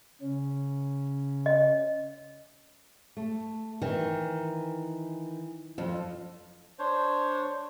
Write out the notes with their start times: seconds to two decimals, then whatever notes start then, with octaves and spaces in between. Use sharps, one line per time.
0.21 C#3 C#4
1.46 D#5
3.17 A3
3.82 D#3 E3
5.78 F2 F4
6.79 D4 C5 C#5